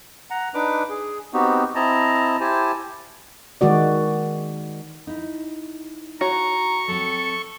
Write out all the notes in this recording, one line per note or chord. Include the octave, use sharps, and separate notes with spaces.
F#5 A#5
D4 D#4 B4 D6
G#4
B3 C4 D#4 F#4 G4
C4 E4 D#5 A5 A#5
E4 G4 C5 G#5 A5
D#3 G#3 F#4 D5
D#4 E4
F#4 C#5 A#5 C#6
F#3 C4 A4 A5